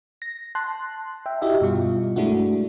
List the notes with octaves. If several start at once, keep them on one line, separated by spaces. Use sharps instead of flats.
A#6
A5 C6 F#6
E5 G5
E4 F#4 G4 D#5 E5
G2 B2 G3 F4
G#3 A3 D4 E4 F#4